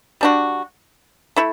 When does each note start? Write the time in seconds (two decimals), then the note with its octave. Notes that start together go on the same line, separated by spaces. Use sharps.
0.21 G3 D4 F#4
1.36 A3 E4